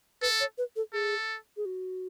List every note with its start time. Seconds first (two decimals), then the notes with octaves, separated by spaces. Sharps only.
0.22 A4 B4
0.40 C#5
0.58 B4
0.76 A4
0.93 G#4 A4
1.57 G#4
1.65 F#4